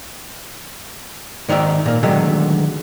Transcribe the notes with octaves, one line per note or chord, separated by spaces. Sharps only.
G#2 D#3 D#4 D5 E5
A#2 A#3
D3 D#3 F#3 G#3 A3